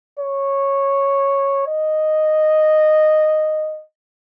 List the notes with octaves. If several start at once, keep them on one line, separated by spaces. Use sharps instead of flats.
C#5
D#5